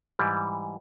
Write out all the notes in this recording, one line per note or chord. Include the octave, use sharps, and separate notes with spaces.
G#2 E3 G3